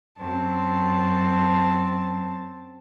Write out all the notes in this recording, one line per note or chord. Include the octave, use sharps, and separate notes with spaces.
F#2 C4 A5